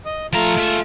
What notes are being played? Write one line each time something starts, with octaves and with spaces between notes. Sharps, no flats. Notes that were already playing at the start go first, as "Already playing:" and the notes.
D#5 D#6
F3 A3 F4 A#5
G#3 E5